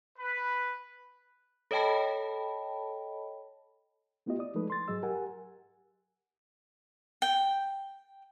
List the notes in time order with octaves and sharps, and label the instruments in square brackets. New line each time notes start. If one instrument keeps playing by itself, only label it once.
[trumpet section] B4
[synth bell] A4 C#5 D#5 G5 A5 B5
[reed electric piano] A3 B3 E4 F4 G4 D#5
D5 D#6
F3 G#3 A3 D#4 A4 B4
C6 A6
G#2 F#3 G#4 D#5 E6
G4 A#4 F#5 G#5
[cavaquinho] G5